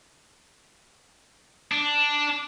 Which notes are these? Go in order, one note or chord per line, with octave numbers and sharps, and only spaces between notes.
D4